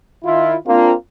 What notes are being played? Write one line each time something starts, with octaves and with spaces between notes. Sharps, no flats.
D#3 E4 F4
A#3 C4 D4 F4